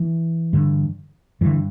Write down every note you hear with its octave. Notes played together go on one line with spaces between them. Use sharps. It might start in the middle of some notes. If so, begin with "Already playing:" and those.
Already playing: E3
G2 D3
G2 D3 E3